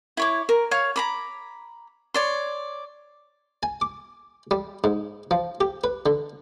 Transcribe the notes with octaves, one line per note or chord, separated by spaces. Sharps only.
E4 C#5 D6
A#4
C#5 F5
A#5 B5 D6
C#5 D5 C6
G#5
D6
G3
G#2
F3
G4
B4
D3